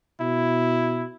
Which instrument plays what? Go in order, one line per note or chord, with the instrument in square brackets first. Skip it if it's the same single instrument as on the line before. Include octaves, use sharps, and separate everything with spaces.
[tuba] B2 [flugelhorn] E4